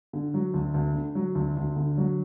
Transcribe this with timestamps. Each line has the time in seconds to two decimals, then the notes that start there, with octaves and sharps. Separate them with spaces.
0.13 D3
0.34 F#3
0.54 D2
0.74 D2
0.95 D3
1.15 F#3
1.35 D2
1.57 D2
1.76 D3
1.98 F#3